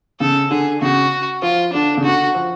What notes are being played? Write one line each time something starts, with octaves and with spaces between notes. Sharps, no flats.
C#3 A4
D3 G#4
C#3 F#4
F3 F4
D3 D4
C#3
D3 F#4
F3